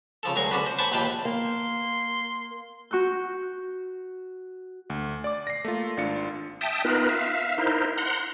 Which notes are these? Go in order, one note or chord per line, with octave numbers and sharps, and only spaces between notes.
C#3 F3 A4
D2 F#3 G#4 A#4 C#6
D3 C#4 D4 F#4 B4
C5
B4 C5 F#5 G#5 A5 D6
A#1 D#2 B4 F5 G5 A5
A#3 C6
F#4 C#6 F#6 G6
D2
D5 D6
A#6 C7
A3 A#3 F4
G#1 D4 F4 C#7
E5 G5 A5 D#6
B3 D#4 F4 A#4 B4
E5 F5
D#4 E4 A#4 C5
F#5 A#5 C6 F#6